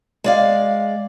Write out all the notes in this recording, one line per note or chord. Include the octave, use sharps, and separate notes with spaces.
G#3 D5 F5